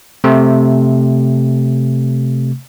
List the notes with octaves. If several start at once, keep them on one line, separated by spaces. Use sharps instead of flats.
C3 A3